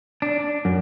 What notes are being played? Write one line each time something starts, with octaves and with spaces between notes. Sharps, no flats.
D4
D4
F#2